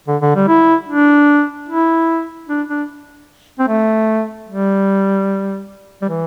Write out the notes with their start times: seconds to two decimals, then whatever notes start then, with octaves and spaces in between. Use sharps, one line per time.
0.08 D3
0.21 D3
0.35 G3
0.47 E4
0.89 D4
1.69 E4
2.48 D4
2.69 D4
3.59 C4
3.68 A3
4.48 G3
6.02 G3
6.09 E3